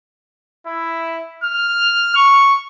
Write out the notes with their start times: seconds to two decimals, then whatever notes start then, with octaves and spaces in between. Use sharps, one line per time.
0.67 E4
1.44 F6
2.15 C#6